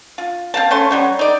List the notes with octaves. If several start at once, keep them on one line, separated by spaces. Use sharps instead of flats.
F4
C4 F5 A5
C#3 A3 C#4 C6
F#3 G3 C#4
D#4 D5